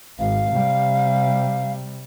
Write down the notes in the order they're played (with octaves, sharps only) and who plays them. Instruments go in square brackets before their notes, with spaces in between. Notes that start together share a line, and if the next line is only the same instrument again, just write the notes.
[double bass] G#1 [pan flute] F5
[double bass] C3 G3